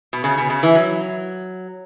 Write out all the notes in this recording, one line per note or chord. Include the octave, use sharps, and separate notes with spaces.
B2
C#3
B2
C#3
E3
F#3